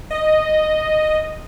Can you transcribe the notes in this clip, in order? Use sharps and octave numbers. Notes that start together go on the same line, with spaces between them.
D#5